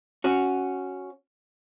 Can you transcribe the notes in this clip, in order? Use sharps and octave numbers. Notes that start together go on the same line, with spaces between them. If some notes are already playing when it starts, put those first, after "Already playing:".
C#4 F#4